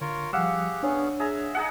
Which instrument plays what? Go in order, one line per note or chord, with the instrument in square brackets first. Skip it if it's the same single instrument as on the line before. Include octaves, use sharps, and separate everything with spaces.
[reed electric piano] D3 [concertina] F4 A#4 C#5
[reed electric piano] F3 G3 [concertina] G4 G#4 [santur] F5 F#5 E6
[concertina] B3 C#4 G#4 [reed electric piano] D4 C#5
[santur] G#4 A#5 [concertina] E5
[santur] D#4 G#4 F#5